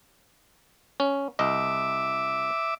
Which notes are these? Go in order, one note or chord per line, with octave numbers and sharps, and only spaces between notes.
C#4
C2 D#5 E5 D6